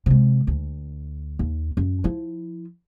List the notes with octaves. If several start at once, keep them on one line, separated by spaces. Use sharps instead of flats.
C3 G#3
D2
D#2
F#2
F3 E4